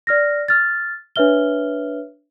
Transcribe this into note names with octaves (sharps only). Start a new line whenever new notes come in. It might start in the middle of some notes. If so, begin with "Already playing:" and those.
D5 F6 A#6
F6 A6
D4 B4 C#5 E5 F6 G7